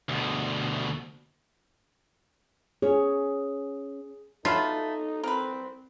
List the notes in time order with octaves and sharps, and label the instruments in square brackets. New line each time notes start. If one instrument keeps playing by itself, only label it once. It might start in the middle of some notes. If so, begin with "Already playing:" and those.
[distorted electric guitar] D2 B2
[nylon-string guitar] C#4 C#5 [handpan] G#4
[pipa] F#3 A3 B4 [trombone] D#4 [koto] F4 [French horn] A4
[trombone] C4 [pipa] A#4 B4